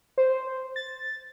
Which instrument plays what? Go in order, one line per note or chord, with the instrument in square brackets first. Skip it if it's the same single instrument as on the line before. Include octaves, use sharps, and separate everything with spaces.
[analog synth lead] C5
A6